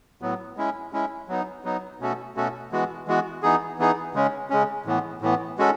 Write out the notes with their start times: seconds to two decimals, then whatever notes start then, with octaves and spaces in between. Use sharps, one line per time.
0.21 A2 F#3 B3
0.57 G#3 C#4 E4
0.93 G#3 C#4 E4
1.28 F#3 B3 D#4
1.64 F#3 B3 D#4
2.00 B2 A3 C#4 F#4 A4
2.35 B2 A3 C#4 F#4 A4
2.72 E3 G#3 B3 F#4
3.07 E3 G#3 B3 F#4
3.43 E3 B3 D#4 G#4
3.79 E3 B3 D#4 G#4
4.14 C#3 G#3 C#4
4.50 C#3 G#3 C#4
4.86 A2 E3 B3
5.22 A2 E3 B3
5.58 G#3 C#4 F#4 A4